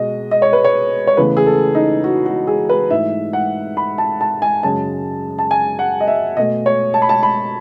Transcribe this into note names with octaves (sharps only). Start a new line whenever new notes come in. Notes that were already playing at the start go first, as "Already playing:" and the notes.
Already playing: B2 G#3 D#5
D#5
C#5
B4
C#5
C#5
E2 C#3 E3 A3 B4
G#4
A4
D#4
F#4
F#4
G#4
B4
G#2 E3 A3 E5
F#5
B5
A5
A5
G#5
F#2 C#3 G#3 A5
A5
G#5
F#5
D#5
E5
B2 A3 D#5
C#5
A5
B5
A5
B5